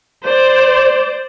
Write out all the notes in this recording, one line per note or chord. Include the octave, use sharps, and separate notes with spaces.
C5 D5